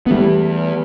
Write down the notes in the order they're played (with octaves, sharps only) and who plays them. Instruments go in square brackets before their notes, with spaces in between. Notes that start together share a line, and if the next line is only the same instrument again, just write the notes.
[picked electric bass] E3 B3 [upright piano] G3 A3